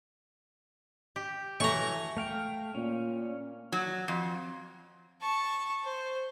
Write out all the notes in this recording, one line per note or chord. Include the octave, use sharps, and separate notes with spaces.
G4
E3 F#3 A3 A#5 C#6
A3 F5 G5
A#2 C#4
F#3
F2
A5 C#6
C5